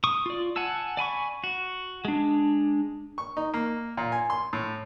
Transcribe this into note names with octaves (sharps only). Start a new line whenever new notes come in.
C#6 D#6
F4 D5
F#5 G#5 A5 E6
D5 G#5 B5 C#6
F#4
G#3 D4
C#6
D#4
A#3
A#2
G#5
C6
A2